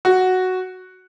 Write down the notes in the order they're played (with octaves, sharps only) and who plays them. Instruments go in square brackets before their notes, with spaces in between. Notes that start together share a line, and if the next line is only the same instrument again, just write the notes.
[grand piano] F#4